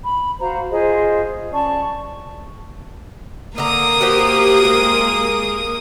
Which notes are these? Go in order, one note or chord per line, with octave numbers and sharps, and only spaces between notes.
B5
F#4 C5 F5 A#5
F4 G#4 C5 D#5
C#4 D5 A5 C#6
D3 A#3 A#4 A#5 D#6
F#4 G4 C5
G#3